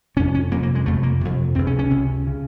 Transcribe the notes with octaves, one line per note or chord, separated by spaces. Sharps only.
F2 C3 C#4
C#4
F2 C3 A#3
A#3
G#3
F2 C3 A3
A#3
F2 C3
C#2 C3 C4
C#4
C#4
C#2 C3
C#3